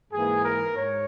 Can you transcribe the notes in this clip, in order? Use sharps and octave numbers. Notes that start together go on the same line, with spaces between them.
G#2 E3 A#3 G#4
A#4
G#2 C#5